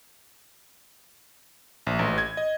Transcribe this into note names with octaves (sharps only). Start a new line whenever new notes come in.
A#1
A1
G#6
D#5